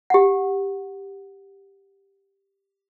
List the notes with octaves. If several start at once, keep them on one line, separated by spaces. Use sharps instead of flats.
G4 F#5